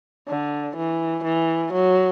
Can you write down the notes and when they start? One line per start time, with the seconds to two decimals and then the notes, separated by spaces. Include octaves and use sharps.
0.28 D3
0.77 E3
1.24 E3
1.73 F#3